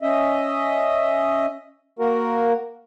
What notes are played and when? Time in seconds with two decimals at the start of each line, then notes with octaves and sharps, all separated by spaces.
0.02 C#4 D#5 E5
1.99 A#3 F#4 A#4